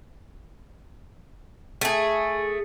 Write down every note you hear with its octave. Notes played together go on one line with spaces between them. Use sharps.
A3 G#4